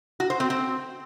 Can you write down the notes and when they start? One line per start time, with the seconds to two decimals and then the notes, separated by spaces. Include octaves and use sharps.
0.20 F#4
0.30 C5
0.40 C4
0.50 C4